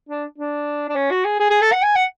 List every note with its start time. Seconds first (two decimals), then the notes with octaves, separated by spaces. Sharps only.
0.09 D4
0.38 D4
0.89 D4
0.96 C#4
1.11 F#4
1.25 G#4
1.40 G#4
1.51 G#4
1.61 A4
1.72 F#5
1.82 G#5
1.96 F#5